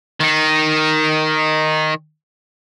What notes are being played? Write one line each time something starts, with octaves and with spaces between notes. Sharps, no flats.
D#3 D#4